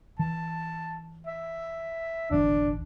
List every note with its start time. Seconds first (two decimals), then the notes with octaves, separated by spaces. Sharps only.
0.19 E3 A5
1.27 E5
2.31 D1 G1 E3 D4